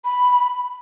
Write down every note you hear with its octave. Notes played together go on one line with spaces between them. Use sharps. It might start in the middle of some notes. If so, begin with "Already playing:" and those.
B5